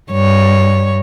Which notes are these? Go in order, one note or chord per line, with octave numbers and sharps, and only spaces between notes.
G2 C#5